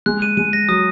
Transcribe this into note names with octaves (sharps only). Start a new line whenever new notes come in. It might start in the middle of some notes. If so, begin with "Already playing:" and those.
G#3 F#6
D#7
G#3 D#7
A#6
F#3 D#6